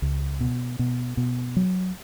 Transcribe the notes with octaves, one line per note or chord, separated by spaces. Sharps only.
C#2
B2
B2
B2
F#3